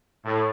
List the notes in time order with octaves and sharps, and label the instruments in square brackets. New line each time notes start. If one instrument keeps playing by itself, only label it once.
[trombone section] A2